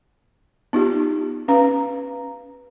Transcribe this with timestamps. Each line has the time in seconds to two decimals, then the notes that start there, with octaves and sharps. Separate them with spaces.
0.73 B3 D#4 F4 G4
1.48 C#4 B4 F5 A#5